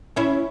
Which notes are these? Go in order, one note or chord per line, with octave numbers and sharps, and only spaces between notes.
C#4 E4